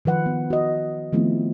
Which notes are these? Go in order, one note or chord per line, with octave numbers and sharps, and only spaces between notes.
D#3 F3 B4 F#5
B3
F#4 D#5
D#3 F3 A3 B3 C4 E4